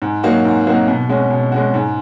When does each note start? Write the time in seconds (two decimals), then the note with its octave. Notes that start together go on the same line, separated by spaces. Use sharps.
0.02 G#2
0.23 F#3 A#3 D#4 F#4
0.45 G#2
0.67 F#3 A#3 D#4 F#4
0.88 B2
1.09 G#3 C#4 F#4
1.31 B2
1.52 G#3 C#4 F#4
1.74 G#2